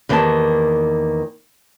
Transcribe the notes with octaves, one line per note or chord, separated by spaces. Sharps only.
E2 D#3 A#3 G4 C5 A5